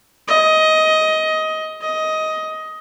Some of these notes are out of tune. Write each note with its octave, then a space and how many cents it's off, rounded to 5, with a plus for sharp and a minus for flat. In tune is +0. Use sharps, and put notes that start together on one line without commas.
D#5 +15
D#5 +15